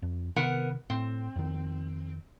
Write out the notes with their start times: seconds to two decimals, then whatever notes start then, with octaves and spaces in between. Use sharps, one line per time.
0.02 F2
0.36 C3 D#3 B3 A#4 F#5
0.90 A2 C4
1.36 F2 D#3